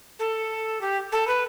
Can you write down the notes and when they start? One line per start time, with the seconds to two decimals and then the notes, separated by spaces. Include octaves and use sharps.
0.19 A4
0.81 G4
1.12 A4
1.27 B4